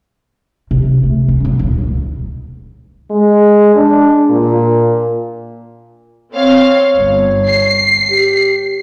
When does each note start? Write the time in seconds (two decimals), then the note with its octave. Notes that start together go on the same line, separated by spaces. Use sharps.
0.71 C3
1.03 A3
1.28 C#4
1.45 F#3
1.59 D#1
1.82 C#2
3.11 G#3
3.75 D4
4.30 A#2
6.34 C4 C#5 F5
6.96 G1
7.47 C7
8.11 G4